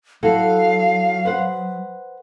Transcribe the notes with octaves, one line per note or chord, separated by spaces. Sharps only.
F#3 E4 F#4 A4 F5
B4 C5 F#5